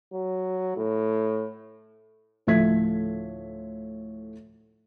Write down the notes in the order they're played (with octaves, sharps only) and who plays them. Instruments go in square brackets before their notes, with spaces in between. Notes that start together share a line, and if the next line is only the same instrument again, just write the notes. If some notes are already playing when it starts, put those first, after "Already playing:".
[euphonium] F#3
A2
[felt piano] D2 A2 F3 E5 G#6 B6